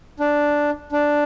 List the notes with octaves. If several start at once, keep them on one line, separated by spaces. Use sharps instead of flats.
D4
D4